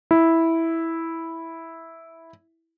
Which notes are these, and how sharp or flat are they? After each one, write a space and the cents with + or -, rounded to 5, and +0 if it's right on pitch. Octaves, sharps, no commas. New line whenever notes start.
E4 -5